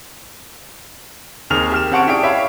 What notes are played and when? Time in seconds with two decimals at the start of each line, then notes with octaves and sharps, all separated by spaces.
1.50 D#2 C4 G#4 A#4 F6 F7
1.72 G4 F6 E7
1.92 C4 C#4 F#5 A5 C#6 D7
2.07 E4 G4 G#4 D5 D7
2.23 G4 C#5 E5 F5 B5